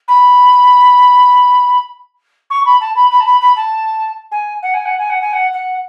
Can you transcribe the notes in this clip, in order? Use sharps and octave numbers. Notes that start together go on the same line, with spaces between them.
B5
C#6
B5
A5
B5
B5
A5
B5
B5
A5
G#5
F#5
G#5
F#5
G#5
F#5
G#5
F#5
F#5